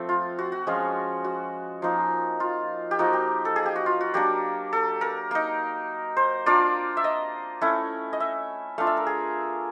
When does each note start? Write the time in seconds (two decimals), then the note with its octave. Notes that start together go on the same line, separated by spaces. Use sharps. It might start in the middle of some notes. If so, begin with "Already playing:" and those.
Already playing: F3 A3 C4
0.09 F4
0.39 F#4
0.52 F#4
0.67 F3 G#3 C#4 F4
1.24 F#4
1.82 F3 A#3 D#4
2.40 F4
2.91 G4
2.99 F3 A#3 D#4 F#4
3.13 G4
3.45 A4
3.56 G#4
3.66 G4
3.76 F#4
3.86 F4
4.01 F#4
4.14 F#3 A#3 D4 G4
4.73 A4
5.01 A#4
5.31 A#3 D#4
6.17 C5
6.46 A#3 D4 F4 D5
6.97 E5
7.04 D#5
7.61 A3 C#4 E4
8.13 D#5
8.20 E5
8.78 A3 D4 F4 F5
8.87 E5
8.97 A#4
9.07 G#4